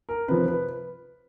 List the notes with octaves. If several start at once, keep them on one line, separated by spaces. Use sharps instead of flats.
A#4
C3 F3 B4
B4